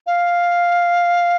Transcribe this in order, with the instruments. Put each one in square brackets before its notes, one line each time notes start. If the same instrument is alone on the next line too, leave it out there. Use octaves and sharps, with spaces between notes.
[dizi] F5